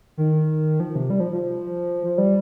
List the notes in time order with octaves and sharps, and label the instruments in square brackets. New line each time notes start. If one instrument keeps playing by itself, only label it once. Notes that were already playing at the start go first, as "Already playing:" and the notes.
[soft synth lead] D#3
F3
C3
G3
F3
F3
F3
G3